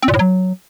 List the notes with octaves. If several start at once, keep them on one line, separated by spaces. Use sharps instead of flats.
C4
A#2
A2
F#3